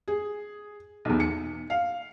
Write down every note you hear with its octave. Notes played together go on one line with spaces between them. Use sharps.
G#4
B1 E2
C#7
F5